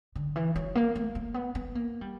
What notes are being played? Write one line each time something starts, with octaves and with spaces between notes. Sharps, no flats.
D3
E3
F#3
A#3
A3
A#3
B3
B3
A#3
G3